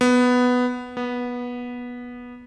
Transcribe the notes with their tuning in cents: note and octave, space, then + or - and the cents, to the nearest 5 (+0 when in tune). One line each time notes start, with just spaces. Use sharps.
B3 +5
B3 -15